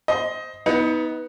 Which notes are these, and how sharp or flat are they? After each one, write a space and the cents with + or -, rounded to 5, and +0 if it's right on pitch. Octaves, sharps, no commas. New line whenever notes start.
C5 -5 D#5 +20
B3 +0 D#4 +30